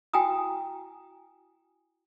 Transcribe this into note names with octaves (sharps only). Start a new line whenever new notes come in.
E4 F#4 G5 G#5 A#5 D#6